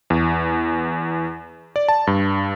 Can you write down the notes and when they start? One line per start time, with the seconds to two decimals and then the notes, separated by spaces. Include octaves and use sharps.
0.10 E2
1.76 D5
1.89 A5
2.07 G2